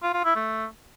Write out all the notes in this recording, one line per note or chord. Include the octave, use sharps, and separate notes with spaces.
F4
F4
E4
A3